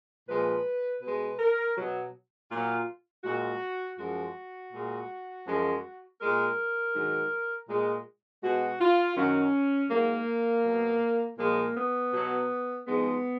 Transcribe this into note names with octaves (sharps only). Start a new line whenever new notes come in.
A#2 F3 G#3 B4
B2 G#3 B4
A#4
B2 F#3
A#2 F#3 F4
A#2 G#3 F#4
F#2 F3 G#3 F#4
A#2 G#3
F#2 F3 G#3
A#2 G#3 A#4
G#2 D#3 F#3
A#2 G#3
B2 G#3 F#4
F4
F#2 D#3 F#3 C#4
G#2 F#3 A#3
B2 F#3
A#2 F3 G#3 A#3
B3
B2 F#3
G#2 F3 G#3 B3